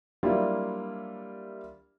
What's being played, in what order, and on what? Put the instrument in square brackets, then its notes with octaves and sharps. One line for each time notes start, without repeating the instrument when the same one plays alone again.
[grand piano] F#3 G3 A#3 D4 E4 F4